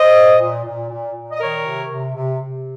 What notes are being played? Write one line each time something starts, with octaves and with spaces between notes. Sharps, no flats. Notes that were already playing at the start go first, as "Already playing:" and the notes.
Already playing: C5 D#5
A#2
A#2
A#2
A#2
A#2
D#5
D#3 A#4 C#5
C3
C3
C3
C3